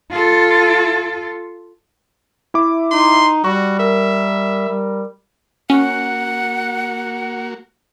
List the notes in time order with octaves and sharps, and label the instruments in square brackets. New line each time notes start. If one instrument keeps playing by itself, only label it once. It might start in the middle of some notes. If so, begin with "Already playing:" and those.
[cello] F4 A4
[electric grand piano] E4 E5 D6
[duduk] D#4 [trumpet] C6
[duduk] G3 [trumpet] F#4 [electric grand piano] C#6
[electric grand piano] A#4 [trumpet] E5
[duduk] G3
[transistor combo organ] A#3 F#4 [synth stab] C#4 [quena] F#5